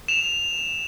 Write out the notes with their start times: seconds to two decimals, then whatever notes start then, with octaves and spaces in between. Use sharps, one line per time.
0.08 E7 F7